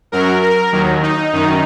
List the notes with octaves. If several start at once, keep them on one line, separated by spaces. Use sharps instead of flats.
F#2 F#3 A#4
A#4
D#2 D#3 F#3
D#4
F#2 D#3